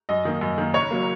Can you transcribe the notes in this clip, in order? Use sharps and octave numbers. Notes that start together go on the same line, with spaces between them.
F#2 D#5
D#3 A#3
F#2
D#3 A#3
F#1 C#5
F#3 A#3